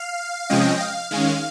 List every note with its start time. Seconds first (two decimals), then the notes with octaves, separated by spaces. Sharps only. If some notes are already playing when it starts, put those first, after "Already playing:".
Already playing: F5
0.50 C3 F3 G#3 C#4 D#5 G5
0.80 F5
1.11 D#3 G#3 C#4 F5